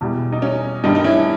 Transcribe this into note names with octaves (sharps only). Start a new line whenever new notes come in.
E2 B2 G3
D#4
C#4
G2 D#3 G3 D#4
D#4
C#4 E4